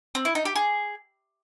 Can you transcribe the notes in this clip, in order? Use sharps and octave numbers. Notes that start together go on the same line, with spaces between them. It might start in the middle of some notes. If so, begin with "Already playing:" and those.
C4
E4
D#4
G4
G#4